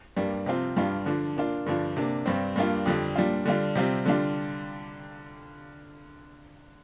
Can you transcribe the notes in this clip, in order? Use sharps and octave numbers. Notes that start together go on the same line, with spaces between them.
G2 G3 A#3 D4
C3 F3 C4 F4
G2 G3 D4 F4
D3 F3 D4
A#2 A#3 D4 F4
G2 D3 F3 D4
C3 A#3 D4
G2 G3 C4
G2 G3 A#3 D4 F4
F2 D3 G3
A#2 G3 D4 F4
D3 G3 D4 F4
C3 G3 C4 F4
D3 G3 D4 F4